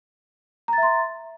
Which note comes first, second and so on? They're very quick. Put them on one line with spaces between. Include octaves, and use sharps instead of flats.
A#5 A6 E5 C6